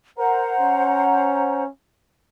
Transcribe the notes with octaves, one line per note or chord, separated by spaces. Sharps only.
A#4 C5 F#5 A#5
C#4